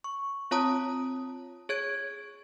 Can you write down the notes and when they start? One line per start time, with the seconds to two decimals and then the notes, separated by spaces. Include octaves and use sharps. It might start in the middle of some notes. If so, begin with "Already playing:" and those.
0.04 C#6
0.51 C4 F4 C#5 A5 A#5 D#6
1.69 G#4 C#5 G#6 D7